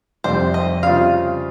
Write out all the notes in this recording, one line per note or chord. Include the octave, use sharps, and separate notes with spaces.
F2 C3 G3 C4 G4 C5
D#5
C#3 G3 C4 F4 F5